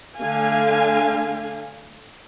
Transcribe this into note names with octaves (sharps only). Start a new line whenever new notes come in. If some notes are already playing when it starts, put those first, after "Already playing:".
D3 A3 F5 G#5